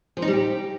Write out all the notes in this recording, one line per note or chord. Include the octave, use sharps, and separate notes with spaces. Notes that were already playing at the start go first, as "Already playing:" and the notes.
F3
D#4
G3
G4